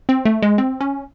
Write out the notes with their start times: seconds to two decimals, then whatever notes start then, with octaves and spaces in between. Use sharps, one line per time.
0.09 C4
0.25 A3
0.42 G#3
0.58 C4
0.81 C#4